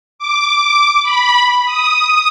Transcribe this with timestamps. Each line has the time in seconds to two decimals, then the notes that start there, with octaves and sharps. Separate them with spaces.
0.19 D6
1.03 B5
1.65 D#6